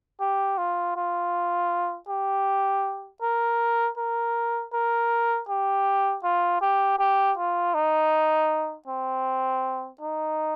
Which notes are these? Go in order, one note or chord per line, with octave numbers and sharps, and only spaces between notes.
G4
F4
F4
G4
A#4
A#4
A#4
G4
F4
G4
G4
F4
D#4
C4
D#4